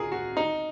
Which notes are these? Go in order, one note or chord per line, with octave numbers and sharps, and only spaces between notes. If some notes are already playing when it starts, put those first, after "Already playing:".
Already playing: D#4 F4 F#4 G#4 A#4
F#4
D#4